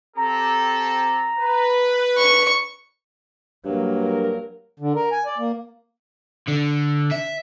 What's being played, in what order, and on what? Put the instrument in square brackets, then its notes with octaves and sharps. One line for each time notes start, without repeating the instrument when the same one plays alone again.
[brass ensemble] C4 G4 A4 [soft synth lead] A#5
[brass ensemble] B4
[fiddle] C#6
[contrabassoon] G2 [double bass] F#3 A#3
[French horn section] A#4
[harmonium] D3
A#4
G#5
D5
A#3
[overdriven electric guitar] D3
E5